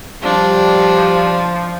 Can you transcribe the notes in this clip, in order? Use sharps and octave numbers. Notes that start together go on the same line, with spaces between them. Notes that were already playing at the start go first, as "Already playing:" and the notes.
F3 G3 D4